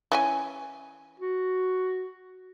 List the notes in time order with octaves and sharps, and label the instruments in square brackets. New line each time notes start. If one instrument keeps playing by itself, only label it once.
[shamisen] E3 C#4 G#5
[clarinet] F#4